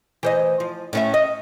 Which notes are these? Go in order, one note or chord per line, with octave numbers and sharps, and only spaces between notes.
E3 C5 D#5
F3
A2 C#4 E5
D#5